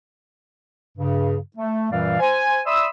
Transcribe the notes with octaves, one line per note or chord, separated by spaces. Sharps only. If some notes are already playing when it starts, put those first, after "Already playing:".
G2 C#3
A3
F#2 A#2 E3 G3 D5 F5
C5 G#5
D5 E5 B5 C6 D#6 E6